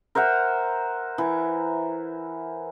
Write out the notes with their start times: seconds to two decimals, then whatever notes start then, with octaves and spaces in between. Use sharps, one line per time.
0.15 A#4 C5 E5 F#5
1.18 E3